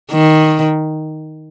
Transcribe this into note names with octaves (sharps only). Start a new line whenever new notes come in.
D#3